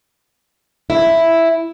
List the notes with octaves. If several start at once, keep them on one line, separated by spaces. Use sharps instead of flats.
E4